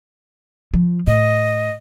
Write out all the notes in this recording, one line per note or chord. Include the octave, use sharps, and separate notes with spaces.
F3
A2 D#5